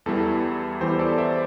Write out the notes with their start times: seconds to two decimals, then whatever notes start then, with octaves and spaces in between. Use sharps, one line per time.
0.06 E2 E3 G3 E4 A4
0.81 E2 E3 G3 E4 G4 C5
0.99 A4 D5
1.18 C5 E5